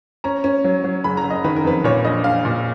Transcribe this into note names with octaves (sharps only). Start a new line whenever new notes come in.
C#4 A#5
C#4
F#3
F#3
F#1 B5
A#5
F#1
D#5
D#3 B4
A#4
F2 B4
A#2 C#5
A#1 D#5
A#1 F5
A#2